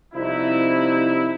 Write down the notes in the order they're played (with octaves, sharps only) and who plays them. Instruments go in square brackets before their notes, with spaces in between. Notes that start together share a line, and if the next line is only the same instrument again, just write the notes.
[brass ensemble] C2 C3 F3 D#4 E4